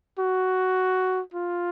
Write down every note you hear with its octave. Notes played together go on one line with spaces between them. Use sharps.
F#4
F4